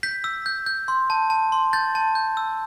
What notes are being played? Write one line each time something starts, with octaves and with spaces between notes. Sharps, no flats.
G6 B6
E6
G6
G6
C6
A5
A5
C6
G6 A6
A5
G6
E6